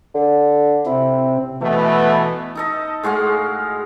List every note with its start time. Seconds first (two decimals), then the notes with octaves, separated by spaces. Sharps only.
0.14 D3
0.86 C3 C4 E4
1.61 B2 E3 A3 B3
2.55 D#4 A4 D#5
3.03 A2 G#3 F#4 F5